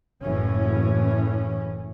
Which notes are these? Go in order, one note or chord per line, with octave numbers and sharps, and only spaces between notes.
F#1 A2 E3 C#4